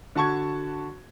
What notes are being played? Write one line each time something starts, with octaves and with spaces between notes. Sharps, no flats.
D3 F#4 A5 C#6 G#6